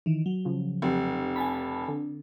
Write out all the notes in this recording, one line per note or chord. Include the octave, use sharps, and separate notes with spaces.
D#3 E3
F#3
C#3 F3
F1
G#5 A5 B5
D3